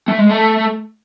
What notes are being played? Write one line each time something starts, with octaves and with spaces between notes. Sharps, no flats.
A3
G#3
A3